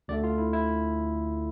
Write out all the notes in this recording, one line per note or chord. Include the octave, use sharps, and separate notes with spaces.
D2 D3 A3 D5
F4
E4
E4